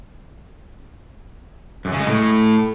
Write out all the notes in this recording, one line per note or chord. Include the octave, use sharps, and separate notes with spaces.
F#2
C#3
G#3
A2